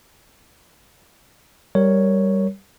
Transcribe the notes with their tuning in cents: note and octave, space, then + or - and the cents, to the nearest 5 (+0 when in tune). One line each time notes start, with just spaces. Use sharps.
G3 -10 A#4 +0 C#5 +0